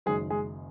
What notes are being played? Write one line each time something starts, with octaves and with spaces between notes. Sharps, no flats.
F#1 F#2 D#3 F#3 G#3 G#4
G#3 G#4